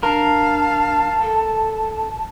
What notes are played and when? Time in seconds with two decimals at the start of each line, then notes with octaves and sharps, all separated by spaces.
0.03 D4 A#4 F5 A5
1.22 A4